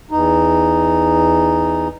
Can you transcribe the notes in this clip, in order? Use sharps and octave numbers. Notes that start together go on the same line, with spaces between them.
E2 D#4